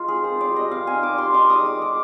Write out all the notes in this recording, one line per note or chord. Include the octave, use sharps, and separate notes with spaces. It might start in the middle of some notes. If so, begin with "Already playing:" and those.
Already playing: G#3 D#4 F4
C4 G#4
C5
F4
D5
G3
D#5
C4 F5
G#5
D#4
D6
G3 C6
D#4 D6
D#6
G#3
D6
G#3
D6